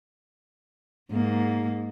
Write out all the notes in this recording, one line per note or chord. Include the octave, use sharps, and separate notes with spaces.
G#2 A#3